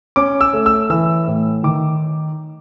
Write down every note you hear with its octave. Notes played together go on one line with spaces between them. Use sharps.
C#4 D6
E6
A3
E6
E3 E6
A2
D#3 D6